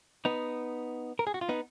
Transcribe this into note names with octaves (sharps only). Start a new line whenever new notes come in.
B3 D#4
A#4
G#4
F#4
F4
B3 D#4